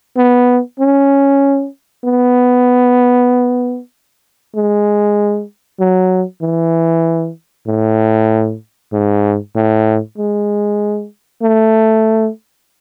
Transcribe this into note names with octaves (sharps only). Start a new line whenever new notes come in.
B3
C#4
B3
G#3
F#3
E3
A2
G#2
A2
G#3
A3